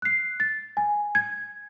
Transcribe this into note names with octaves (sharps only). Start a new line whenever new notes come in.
F#6 C7
A6
G#5
G#6